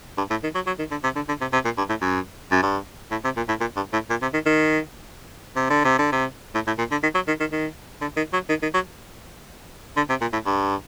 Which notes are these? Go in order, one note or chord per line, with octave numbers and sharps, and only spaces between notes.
G2
A2
D#3
F#3
F#3
D#3
D3
C3
D3
D3
C3
C3
A#2
G2
A2
F#2
F#2
G2
A2
C3
A#2
A2
A#2
G2
A2
A#2
C3
D#3
D#3
C3
D3
C3
D3
C3
A2
A2
A#2
D3
D#3
F#3
D#3
D#3
D#3
D3
D#3
F#3
D#3
D#3
F#3
D3
C3
A#2
A2
G2